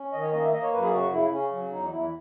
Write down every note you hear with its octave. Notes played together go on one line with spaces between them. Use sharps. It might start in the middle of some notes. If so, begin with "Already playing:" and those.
Already playing: C#4
D#3 D#5
C#5
A#3 D#5
E5
A#3 D#5
C#5
F#2 B4
G#4
C#3 F#4
C#3 E4
C#3 C#4
F#3
E2 D#4
E2 E4